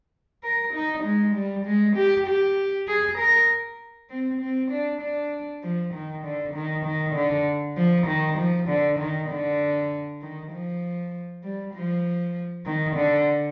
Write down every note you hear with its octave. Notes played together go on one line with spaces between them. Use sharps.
A#4
D#4
G#3
G3
G#3
G4
G4
G#4
A#4
C4
C4
D4
D4
F3
D#3
D3
D#3
D#3
D3
F3
D#3
F3
D3
D#3
D3
D#3
F3
G3
F3
D#3
D3